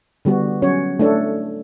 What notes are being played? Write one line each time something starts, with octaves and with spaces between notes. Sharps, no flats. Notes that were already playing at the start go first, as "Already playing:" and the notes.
D3 G3 B3 F#4
F#3 C#4 F#4 C#5
A3 D4 A4 C#5